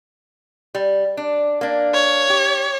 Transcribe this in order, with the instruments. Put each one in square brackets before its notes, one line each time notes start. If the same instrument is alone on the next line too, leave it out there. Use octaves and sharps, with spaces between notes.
[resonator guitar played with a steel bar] G3
D4
A#3 D4
[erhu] C#5
[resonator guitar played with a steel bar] G4